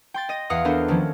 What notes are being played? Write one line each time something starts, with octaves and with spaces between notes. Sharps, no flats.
G5 C6 A6
D#5 A#6 D#7
E2 F5 F#5 D#6 F6
B3 D4 A4 A#4 C5
D#3 F3 A3 A#3 C#4